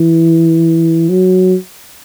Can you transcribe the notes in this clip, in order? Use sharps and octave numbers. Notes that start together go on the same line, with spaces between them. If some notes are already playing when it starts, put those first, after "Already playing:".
Already playing: E3
F#3